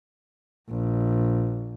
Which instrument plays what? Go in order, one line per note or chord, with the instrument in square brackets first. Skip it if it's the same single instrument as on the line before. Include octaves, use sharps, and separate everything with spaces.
[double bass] A#1